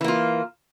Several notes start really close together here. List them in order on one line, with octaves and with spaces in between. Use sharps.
E3 A#3 F4